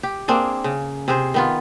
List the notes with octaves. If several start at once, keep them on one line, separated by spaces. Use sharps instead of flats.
G4
A#3 C4 D4 G#4
C#3
C3 G#4 C5
D#3 B3 F4